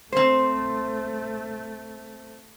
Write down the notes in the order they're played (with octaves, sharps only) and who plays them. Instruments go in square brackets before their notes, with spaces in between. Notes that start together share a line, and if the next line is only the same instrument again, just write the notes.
[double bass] A3 [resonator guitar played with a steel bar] C4 C5